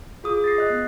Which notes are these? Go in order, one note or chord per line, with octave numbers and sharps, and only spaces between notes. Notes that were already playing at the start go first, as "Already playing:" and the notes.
F4 G#4 D6 D#6
A6 A#6 C7
D#5 F#6
B3